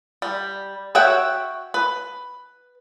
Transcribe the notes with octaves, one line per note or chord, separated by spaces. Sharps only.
G3
F#4 C#5 E5 F#5 G5
B4